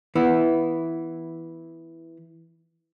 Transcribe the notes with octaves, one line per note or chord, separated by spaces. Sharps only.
E3 B3 E4